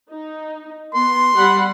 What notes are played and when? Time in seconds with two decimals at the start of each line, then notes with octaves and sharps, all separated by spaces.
0.11 D#4
0.94 B3 C6
1.37 G3 F#5 B5